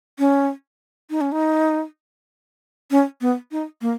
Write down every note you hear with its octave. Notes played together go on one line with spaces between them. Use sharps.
C#4
D#4
C#4
D#4
C#4
B3
D#4
A#3